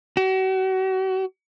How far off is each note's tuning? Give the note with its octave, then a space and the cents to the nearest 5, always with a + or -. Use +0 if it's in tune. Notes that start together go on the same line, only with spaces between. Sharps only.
F#4 +40